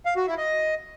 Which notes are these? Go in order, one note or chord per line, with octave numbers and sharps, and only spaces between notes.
F5
F#4
E4
D#5